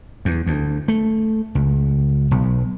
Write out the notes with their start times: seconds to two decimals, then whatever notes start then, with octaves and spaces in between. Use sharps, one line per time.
0.25 E2
0.46 D2
0.88 A3
1.55 C#2
2.31 B1